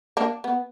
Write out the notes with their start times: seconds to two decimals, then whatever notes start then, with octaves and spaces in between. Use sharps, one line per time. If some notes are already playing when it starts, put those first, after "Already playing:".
0.17 A#3 D4
0.44 B3